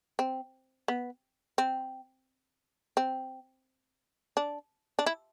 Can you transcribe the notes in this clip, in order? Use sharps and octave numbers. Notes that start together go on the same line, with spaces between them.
C4
B3
C4
C4
D4
D4
E4